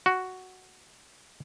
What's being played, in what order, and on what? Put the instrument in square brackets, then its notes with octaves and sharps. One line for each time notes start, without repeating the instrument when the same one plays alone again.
[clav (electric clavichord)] F#4